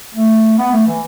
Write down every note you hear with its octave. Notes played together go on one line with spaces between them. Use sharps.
A3
B3
A3
E3